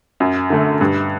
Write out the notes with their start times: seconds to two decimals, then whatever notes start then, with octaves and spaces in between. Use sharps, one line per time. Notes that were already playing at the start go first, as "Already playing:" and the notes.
0.20 F#2
0.50 D3 A3
0.81 G2